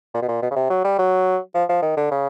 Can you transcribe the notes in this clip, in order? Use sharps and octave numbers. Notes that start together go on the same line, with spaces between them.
A#2
B2
A#2
B2
C#3
C3
F#3
G3
F#3
F3
F3
D#3
D3
C#3